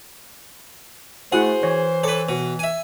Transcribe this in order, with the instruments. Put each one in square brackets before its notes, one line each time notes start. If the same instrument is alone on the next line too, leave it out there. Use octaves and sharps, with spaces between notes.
[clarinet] A3 [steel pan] E4 F#4 F#5 [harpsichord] G#4 [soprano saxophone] C5
[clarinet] E3 [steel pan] C#5
[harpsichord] A4 B4 [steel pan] C#5 D6
[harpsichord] B2
E5 G#5